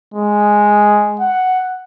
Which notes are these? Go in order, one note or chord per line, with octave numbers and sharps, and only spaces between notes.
G#3
F#5